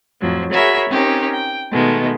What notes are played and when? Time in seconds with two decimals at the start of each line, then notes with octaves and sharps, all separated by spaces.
0.21 F2 A2 F3 F#3
0.52 F#4 G#4 A#4 C#5 E5 B5
0.88 C4 C#4 D#4 G4 A#4
1.33 G5
1.71 B2 D#3 G#3 A3